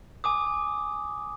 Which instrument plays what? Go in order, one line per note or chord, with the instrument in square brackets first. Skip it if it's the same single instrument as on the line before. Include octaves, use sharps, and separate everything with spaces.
[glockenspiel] G#5 D6 D#6